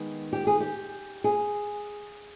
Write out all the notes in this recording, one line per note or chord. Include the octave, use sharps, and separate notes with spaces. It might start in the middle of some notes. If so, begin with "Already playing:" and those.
Already playing: D#3 G#3 B3
G4
G#4
G4
G#4